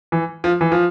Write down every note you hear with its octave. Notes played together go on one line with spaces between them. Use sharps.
E3
F3
E3
F3